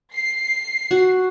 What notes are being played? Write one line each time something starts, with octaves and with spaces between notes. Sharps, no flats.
C7
F#4